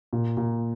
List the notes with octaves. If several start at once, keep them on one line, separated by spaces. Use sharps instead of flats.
A#2
A#2